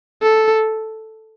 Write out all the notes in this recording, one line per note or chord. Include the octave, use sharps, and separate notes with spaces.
A4